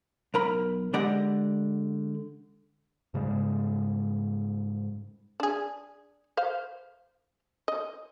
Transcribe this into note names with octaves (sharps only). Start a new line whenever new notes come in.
B1 A#4 B5
D3 G#3 G4 D5 D#5 F#5
G#2 C#3 G3 G#3
D4 G#4
C5 F5
D#5